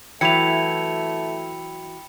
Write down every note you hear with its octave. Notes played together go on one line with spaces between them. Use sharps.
E3 F#3 A3 G5 B5 C#7 F7